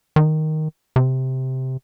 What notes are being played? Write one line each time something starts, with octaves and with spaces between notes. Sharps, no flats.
D#3
C3